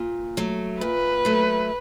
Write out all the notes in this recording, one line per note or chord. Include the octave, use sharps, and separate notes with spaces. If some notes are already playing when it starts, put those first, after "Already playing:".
Already playing: A#2
F#3 A3
A#2 B4
F#3 A3